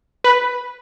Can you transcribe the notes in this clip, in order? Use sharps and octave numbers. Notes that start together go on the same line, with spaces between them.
B4